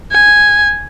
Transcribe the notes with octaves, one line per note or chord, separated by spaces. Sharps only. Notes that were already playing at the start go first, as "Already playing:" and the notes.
G#5